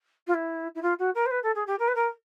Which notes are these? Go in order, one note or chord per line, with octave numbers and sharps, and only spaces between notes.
F4
E4
E4
F4
F#4
A#4
C5
B4
A4
G#4
G4
A#4
B4
A#4